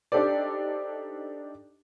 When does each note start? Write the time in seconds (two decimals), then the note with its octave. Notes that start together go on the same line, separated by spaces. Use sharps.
0.12 D4 D#4 G4 A4 C5 D5